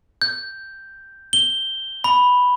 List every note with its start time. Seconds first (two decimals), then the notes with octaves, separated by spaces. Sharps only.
0.22 G6
1.33 G7
2.04 B5